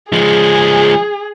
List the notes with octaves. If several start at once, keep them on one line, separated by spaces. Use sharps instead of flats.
F3 G#3 G#4